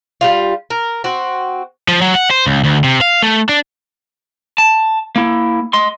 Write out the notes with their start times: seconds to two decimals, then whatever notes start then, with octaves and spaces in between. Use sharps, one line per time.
0.21 G3 G#3 F4
0.70 A#4
1.04 C4 F#4
1.88 F3
2.02 F#3
2.15 F#5
2.31 C5
2.47 C#2
2.64 D2
2.84 C3
3.01 F5
3.23 A3
3.49 D4
4.58 A5
5.16 A#3 E4
5.73 D#5 C6